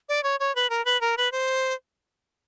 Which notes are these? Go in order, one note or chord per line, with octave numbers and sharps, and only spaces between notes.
D5
C#5
C#5
B4
A#4
B4
A#4
B4
C5